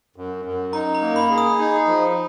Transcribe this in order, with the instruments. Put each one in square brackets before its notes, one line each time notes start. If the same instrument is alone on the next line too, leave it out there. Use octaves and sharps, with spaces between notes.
[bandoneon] F#2
F#2
[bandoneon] D#4 [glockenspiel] A#5
[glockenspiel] A#5
[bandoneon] A#3
[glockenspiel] B5
[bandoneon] G#4
[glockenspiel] D#6
[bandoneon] D#4
F3